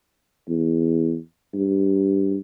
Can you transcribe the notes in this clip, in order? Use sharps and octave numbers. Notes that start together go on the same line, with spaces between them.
E2
G2